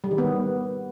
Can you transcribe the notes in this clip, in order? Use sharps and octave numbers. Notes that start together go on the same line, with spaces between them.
G3
D#3
B3